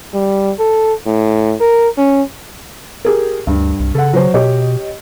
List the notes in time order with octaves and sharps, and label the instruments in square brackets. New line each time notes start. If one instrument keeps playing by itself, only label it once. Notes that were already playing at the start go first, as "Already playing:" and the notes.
[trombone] G3
A4
A2
A#4
C#4
[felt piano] G4 G#4 A#4
[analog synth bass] D2 [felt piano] G2
[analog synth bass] C2
[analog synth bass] C#3 [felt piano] A4 F#5
[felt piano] F#3 C5
[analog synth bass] B2 [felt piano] G4 C#5 D#5